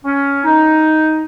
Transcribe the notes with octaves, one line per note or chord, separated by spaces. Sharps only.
C#4
D#4